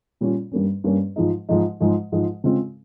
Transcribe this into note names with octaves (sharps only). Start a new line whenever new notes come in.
A#2 G3 C#4 F4
G2 G3 A#3 C#4
G2 G3 A#3 C#4
G#2 F3 G#3 D#4
G#2 F3 G#3 D#4
G#2 F3 G#3
G#2 F3 G#3
C#3 G#3 C4 F4